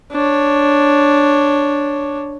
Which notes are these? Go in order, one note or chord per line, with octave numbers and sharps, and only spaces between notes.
D4 C#5